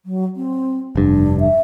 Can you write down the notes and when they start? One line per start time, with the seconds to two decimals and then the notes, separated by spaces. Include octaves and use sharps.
0.06 F#3
0.36 C4
0.95 F1 G2 D4
1.40 E5